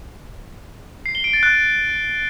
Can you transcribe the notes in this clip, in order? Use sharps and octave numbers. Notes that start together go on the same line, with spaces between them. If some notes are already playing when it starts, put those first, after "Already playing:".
C7
G7
D7
A6
F#6